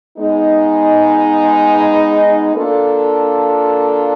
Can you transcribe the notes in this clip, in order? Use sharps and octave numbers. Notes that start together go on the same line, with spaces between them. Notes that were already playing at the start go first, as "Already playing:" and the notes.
G#3 B3 D#4
A#3 D4 F4 A4